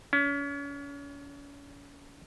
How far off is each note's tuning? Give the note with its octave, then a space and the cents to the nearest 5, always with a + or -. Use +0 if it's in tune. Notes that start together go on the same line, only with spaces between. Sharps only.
C#4 +35